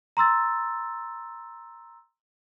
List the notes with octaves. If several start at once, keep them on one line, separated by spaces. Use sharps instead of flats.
A#5 C6 E6 A6